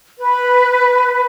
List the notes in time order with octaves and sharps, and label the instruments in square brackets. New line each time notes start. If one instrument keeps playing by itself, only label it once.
[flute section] B4